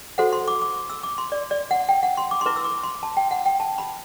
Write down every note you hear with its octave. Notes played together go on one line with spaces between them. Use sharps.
F#4 A4 C5 F#5
C6
D6
D6
E6
D6
C6
D5
D5
F#5
G5
F#5
C6
D6
C6
E4 B4 D6
E6
D6
C6
A5
G5
F#5
G5
A5
B5